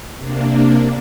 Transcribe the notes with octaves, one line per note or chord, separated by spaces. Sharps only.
C3 A#3 D4